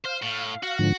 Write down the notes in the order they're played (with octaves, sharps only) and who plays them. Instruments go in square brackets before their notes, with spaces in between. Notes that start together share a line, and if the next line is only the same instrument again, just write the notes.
[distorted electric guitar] C5 [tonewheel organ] F5
[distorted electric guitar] A2
[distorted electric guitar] F#4 [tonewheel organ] F5
[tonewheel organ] G#2 D3 F3